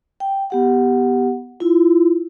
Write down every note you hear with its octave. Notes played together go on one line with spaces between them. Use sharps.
G5
B3 G4 F#5
E4 F4